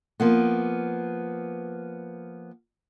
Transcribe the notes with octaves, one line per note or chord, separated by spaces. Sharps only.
F3 A#3 B3